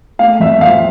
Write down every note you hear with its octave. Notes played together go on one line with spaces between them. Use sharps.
A3 F5
F2 E5
F3 F5